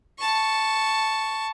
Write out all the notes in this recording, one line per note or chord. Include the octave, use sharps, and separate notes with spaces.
A5 C#6